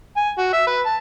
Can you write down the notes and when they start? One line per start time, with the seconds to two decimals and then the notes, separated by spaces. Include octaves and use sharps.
0.16 G#5
0.38 F#4
0.53 E5
0.66 B4
0.85 A5